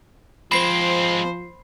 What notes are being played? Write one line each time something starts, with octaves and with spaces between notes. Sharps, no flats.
F3 G#3 C4 C5 B5 C7